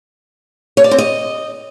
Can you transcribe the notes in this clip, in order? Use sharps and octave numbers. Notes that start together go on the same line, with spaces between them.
C#5
D5
C4
D#5